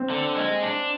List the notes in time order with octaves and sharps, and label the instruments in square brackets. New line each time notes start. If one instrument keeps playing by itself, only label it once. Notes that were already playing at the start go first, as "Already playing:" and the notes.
Already playing: [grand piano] C4
[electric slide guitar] D3
G#3
D4